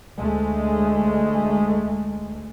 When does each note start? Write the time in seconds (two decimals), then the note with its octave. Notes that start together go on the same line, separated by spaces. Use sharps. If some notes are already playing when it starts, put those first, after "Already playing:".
0.17 D2 G#3 A3